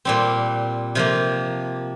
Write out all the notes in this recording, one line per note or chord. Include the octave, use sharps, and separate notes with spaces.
A#2 G3 C4
C3 F3 A#3